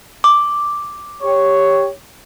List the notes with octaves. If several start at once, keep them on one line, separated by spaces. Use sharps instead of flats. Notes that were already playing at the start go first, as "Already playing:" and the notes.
D6
G4 C#5